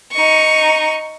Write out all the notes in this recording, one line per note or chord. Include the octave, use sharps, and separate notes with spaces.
D#4 C#6